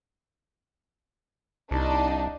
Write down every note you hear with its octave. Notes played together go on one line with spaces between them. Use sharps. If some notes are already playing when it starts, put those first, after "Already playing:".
C2 D4 D#4